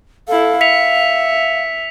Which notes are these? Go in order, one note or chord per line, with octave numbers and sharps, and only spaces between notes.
E4 A4 F5
E5 B6 C#7 F7